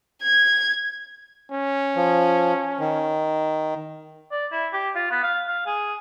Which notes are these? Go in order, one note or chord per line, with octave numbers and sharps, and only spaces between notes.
G#6
C#4
F3
D#3
D5
E4
G4
F4
B3
F5
F5
G#4